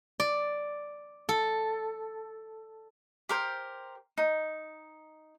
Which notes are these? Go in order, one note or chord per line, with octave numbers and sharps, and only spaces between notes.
D5
A4
G4 A#4 C5
D#4